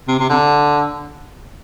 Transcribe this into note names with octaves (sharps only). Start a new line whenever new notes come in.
C3
C3
D3